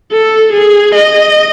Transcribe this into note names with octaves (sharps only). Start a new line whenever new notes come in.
A4
G#4
D#5